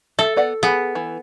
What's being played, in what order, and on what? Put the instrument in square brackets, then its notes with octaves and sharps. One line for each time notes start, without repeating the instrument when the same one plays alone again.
[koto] A4 [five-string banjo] E5
[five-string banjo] B3 D5 F#5
[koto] B3 [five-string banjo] G#4
[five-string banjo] E3